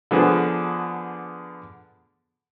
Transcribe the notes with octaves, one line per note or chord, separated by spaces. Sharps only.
D3 F3 B3 G#4